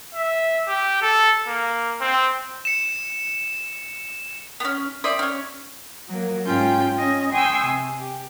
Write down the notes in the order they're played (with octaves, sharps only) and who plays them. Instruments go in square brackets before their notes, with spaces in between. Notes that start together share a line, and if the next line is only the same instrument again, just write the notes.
[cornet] E5
G4
A4
A#3
C4
[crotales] C#7 E7
[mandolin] B3 C#4
C4 D5 E5 D#6
C#4 C#5
[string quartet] F#3 A#3
G#2 C#4 F4 G5 G6
C#4 D#5
G5 G#5 C6 C#6 D#6 E6
C3
G4